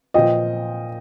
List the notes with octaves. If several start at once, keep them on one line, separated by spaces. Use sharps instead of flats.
A#2 F3 D#5 G5